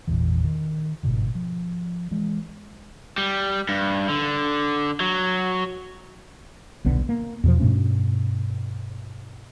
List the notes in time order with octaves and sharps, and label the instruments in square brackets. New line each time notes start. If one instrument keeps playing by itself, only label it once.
[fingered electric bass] G#1 E2 A#2 E3
D#3
G1 G#2 B2 D3
F3
E3 G#3
[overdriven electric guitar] G3
G2
D3
F#3
[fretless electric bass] D#1 B1 D3 B3
A#3
E2 B2 F3
G2 B2 A3 C#4